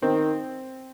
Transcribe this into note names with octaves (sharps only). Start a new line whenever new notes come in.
D#3 C4